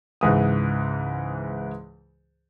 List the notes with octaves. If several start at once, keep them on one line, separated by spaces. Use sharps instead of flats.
C#2 G#2 E3 D#6